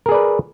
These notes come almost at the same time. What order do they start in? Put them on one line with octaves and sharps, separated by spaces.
A#4 G#4 D5 B4